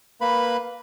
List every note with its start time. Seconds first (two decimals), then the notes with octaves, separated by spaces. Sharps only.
0.21 A#3 B4 B5